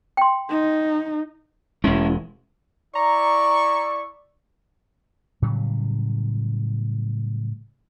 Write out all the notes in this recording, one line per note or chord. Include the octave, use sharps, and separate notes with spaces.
G5 C6
D#4
E1 G#3 C#4 E4
E4 D5 A#5 C#6
A2 C#3 F#3 G3